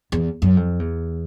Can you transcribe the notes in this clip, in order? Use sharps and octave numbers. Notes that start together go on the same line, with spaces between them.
E2
F#2
F2
E2